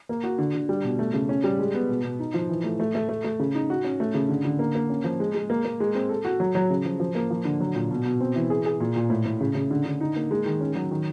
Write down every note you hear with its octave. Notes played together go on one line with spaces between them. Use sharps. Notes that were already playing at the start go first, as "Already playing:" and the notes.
A#3
F#4
D3
D3
G3
B2
A3
C#3
C#4
G3
G#3
B3
B2
B2
D#4
F3
E3
A3
A3
A3
A3
A3
C#3
D#4
F#4
C#4
A3
C#3
D3
D3
A#3
A#3
C#4
F3
G#3
G#3
A#3
A#3
G#3
C4
A4
F#4
F#3
F#3
C#3
F3
F3
A#3
F3
D3
F#3
A#2
B2
B2
C4
E3
G#4
G#4
A#2
A#2
A2
A2
C#3
C#3
D3
D3
D#4
A#3
G#3
D#3
C#4
F#3
D#3